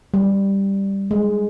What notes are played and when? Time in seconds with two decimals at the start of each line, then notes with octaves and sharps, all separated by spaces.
0.14 G3
1.11 G#3